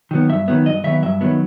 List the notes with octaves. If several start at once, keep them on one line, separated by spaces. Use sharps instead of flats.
D#3 F#3 B3
G2 E5
D#3 F#3 B3
G2 D#5
D#3 F#3 B3 E5
G2 E5
D#3 F#3 B3